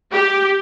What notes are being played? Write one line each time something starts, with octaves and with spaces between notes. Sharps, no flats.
G4